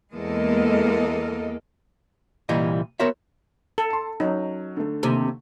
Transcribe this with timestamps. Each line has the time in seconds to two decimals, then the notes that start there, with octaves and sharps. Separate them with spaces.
0.13 E2 G#3 A#3 A4 A#4 D#5
2.49 C2 A#2 E3 G3 D#5
3.00 B3 F#4 A#4 C5 C#5 E5
3.78 A4
3.90 A5 C6
4.20 F#3 C#4 D#4
4.77 D3 A3
5.03 D#2 C3